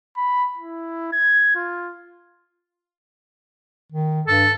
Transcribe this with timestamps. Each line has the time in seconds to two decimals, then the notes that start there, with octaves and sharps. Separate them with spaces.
0.17 B5
0.58 E4
1.13 G#6
1.55 F4
3.92 D#3
4.27 G2 A4